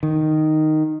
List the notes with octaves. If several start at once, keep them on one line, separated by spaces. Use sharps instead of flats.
D#3